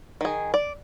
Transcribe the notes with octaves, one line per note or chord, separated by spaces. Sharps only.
D#3 G#4
D5